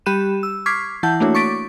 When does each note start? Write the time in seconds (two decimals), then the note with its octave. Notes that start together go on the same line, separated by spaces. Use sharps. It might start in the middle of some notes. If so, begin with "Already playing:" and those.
0.06 G3 G4 B5 F#6 D#7 E7
0.43 E6
0.66 C#6 D6 F6 G#6 B6 C7
1.03 E3 E4 F#5 A5 G6
1.20 A3 A#3 D4 E4 F#4 C#5
1.35 C#6 D6 A6 B6 D7